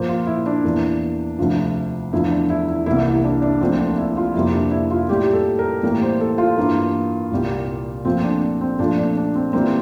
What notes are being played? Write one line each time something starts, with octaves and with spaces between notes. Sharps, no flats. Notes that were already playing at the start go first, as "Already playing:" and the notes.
Already playing: A#2 F3 A#3 C5
F4
E4
D4
E2 E3 A#3
D2 C3 F3
E2 D3 F3 A3 E4
D4
E4
E4
C2 C3 E3 A#3 E4
E4
D4
D4
D2 D3 F3 A#3 C4
D4
E4
F4
F2 C3 G3 A#3 E4
D4
E4
F4
A2 G3 A#3 G4
A4
A#4
A2 E3 G3 A#3
C5
A4
F4
G2 E3 A#3
C2 A#2 G3 A#3
A#2 F3 A3 C4
D4
C4
A#2 F3 A3 D4
D4
D4
C4
E3 G3 A#3 C4